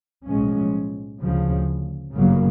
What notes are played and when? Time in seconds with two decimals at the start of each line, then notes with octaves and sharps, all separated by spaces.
0.26 B1 A2 F3 G#3 C#4
1.21 D2 C#3 F3
2.15 G1 F#2 C#3 F#3 A#3